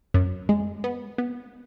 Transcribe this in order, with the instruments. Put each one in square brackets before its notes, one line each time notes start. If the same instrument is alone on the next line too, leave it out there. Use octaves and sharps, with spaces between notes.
[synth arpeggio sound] F#2
G#3
B3
B3